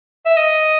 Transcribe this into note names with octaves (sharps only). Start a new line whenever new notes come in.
E5
D#5